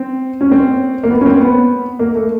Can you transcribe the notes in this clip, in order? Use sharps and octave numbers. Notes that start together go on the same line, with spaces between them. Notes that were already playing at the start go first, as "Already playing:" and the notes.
Already playing: C4
C#4
C4
A#3
B3
C#4
C4
B3
A#3
A3